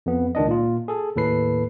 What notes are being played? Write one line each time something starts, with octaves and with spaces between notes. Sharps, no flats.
F2 B3
C#2 D#3 D4 D#5
A#2 F4
G#4 A4
D#2 A2 A4 B4 C7